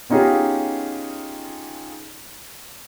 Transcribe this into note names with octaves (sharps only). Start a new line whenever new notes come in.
B3 C#4 D#4 F4 G4 G#4